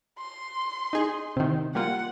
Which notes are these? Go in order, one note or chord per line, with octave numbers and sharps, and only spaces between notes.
C6
D#4 G#4
C3 D#3
G3 A#3 F4 F#5